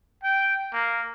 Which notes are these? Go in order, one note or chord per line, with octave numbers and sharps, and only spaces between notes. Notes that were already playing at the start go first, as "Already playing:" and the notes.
G5
A#3